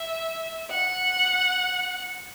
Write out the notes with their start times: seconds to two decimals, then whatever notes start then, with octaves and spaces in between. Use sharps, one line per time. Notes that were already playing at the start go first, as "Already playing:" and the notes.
Already playing: E5
0.71 F#5